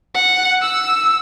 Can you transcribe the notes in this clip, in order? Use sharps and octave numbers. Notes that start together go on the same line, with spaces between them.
F#5
E6